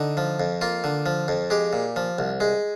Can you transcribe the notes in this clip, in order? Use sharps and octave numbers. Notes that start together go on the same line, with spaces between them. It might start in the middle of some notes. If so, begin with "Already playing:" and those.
Already playing: D3 D#4
F3
F2
A#3 F4
D3
F3
F2
G#3 G4
A#2
F3
C2
G#3